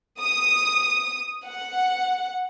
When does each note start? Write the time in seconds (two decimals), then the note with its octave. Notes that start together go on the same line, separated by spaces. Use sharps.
0.21 D#6
1.47 F#5